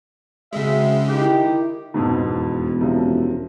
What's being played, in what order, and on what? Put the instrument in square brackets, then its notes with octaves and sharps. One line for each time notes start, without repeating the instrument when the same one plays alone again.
[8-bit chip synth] C#3 G#3 [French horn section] C4 F#4 G#4 [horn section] E5
[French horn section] D#3 D#4 E4 [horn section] G4
[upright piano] F2 G#2 B2
[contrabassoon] E1
[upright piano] F#2 C3 F3